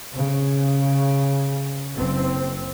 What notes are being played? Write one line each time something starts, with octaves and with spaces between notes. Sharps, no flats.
C#3
F#1 C4